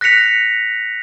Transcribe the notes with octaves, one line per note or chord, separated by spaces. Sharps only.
F#6 A#6 B6 C#7 F7